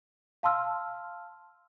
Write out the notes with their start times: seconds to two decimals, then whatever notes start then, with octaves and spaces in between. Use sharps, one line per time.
0.43 F5 A5 C6 E6 F6